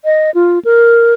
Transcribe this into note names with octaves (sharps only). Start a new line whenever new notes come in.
D#5
F4
A#4